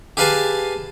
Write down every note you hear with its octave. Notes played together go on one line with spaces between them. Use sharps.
G4 G#4 B4 F5 G#5 A5